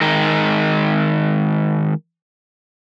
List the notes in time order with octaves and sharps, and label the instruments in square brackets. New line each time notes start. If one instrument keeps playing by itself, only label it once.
[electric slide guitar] D#3 G#3 A#4